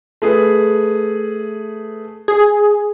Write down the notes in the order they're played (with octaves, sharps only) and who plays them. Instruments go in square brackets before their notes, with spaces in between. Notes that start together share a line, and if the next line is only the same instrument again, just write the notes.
[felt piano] A3 G#4 B4
[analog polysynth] G#4